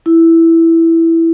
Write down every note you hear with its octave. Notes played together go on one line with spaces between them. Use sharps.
E4